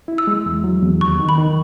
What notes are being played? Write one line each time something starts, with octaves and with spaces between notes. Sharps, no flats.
E4
E6
G#3
E2
F#3
E2
D#2 C#6
D#3
B5
D#3